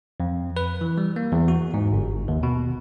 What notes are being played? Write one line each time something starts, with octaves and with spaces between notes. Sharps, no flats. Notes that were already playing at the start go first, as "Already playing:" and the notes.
F2
B4
E3
G3
A#3
E2
F#4
G#2
G1
D#2
B2